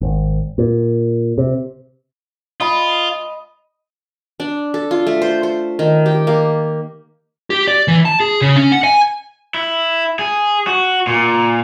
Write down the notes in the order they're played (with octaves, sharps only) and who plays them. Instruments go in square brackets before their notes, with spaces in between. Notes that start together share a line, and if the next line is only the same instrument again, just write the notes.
[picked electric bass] G#1
A#2
C3
[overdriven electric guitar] F4 [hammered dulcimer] D#5 B5
[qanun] D4
A4
F4
A3
C5
C5
D#3
G4
A#3
[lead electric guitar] G4
D5
E3
A5
G#4
C#3
C#4
F#5
G#5
[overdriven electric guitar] E4
G#4
F#4
A#2